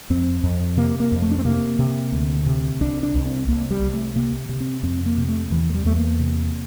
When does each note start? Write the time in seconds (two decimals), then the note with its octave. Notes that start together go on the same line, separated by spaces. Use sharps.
0.10 F2 C4
0.43 F2
0.77 C3 A#3
1.00 A#3
1.12 F2
1.22 A3
1.31 D4
1.38 C4
1.45 C3 A#3
1.79 C3
2.12 D2
2.46 C3
2.81 C2 D4
3.03 D4
3.15 C2
3.26 C4
3.48 C2 A#3
3.71 G3
3.82 C2
3.93 A3
4.15 C3 A#3
4.49 C3
4.60 C4
4.83 F2 C4
5.06 A#3
5.18 C3
5.28 A3
5.51 E2 E3
5.70 A3
5.74 G3
5.85 E2 A3
5.96 A#3
6.19 C3